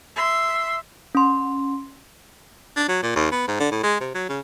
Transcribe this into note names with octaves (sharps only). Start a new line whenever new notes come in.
E5 C6
C#4 C6
D4
F#3
A#2
D#2
B3
G#2
D3
A2
G#3
C3
F#3
C#3